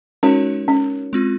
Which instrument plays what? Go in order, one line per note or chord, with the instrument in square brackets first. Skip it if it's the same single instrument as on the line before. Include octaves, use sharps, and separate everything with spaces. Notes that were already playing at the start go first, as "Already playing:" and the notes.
[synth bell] G#3 D#4 F#4 A#4 C#5 [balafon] C#4
[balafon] C#4
[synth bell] G#3 C4 F4